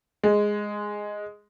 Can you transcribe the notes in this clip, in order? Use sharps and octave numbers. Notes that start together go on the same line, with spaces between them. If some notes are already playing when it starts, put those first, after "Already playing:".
G#3